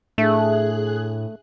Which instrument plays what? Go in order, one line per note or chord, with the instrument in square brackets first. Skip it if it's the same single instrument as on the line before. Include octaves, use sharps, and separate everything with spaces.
[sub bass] A2 [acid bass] A3 [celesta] D4 E5 [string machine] G#4 F#6